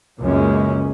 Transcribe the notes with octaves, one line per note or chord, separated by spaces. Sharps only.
C#2 F#2 G#3 A#3 C#4